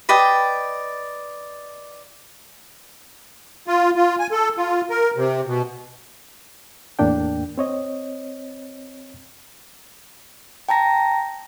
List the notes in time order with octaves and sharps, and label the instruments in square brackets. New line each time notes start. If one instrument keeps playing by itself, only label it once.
[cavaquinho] B4 D5 D#5 G5
[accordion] F4
F4
G#5
A4
F4
A#4
C3
B2
[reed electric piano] E2 A2 A#3 D4 G5
C4 C#5 D#5
[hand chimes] G5 A5 A#5 A#6